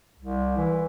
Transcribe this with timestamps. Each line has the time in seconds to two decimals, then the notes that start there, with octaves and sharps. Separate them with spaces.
0.20 C2
0.57 E3